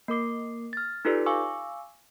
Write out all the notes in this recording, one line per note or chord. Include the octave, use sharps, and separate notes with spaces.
A#3 A#4 D6 C7
F6 A6
D#4 F4 G4 A4 B4 D5
F5 G#5 C#6 D6 E6